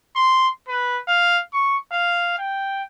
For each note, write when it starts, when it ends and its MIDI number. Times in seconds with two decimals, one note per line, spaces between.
0.16 0.48 84
0.68 0.99 71
1.08 1.40 77
1.53 1.77 85
1.92 2.36 77
2.38 2.82 79